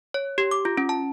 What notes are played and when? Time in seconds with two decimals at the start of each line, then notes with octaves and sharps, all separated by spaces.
0.14 C#5
0.38 G4
0.51 D6
0.65 F4
0.77 C#4
0.89 A5